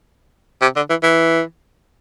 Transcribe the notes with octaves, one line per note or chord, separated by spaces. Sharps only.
C3
D3
E3
E3